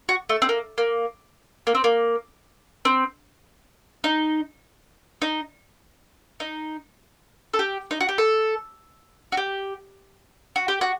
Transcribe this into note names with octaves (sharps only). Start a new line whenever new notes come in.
F#4
A3
C4
A#3
A#3
A#3
C4
A#3
C4
D#4
D#4
D#4
A4
G4
D#4
F#4
G4
A4
F#4
G4
F#4
G4
F#4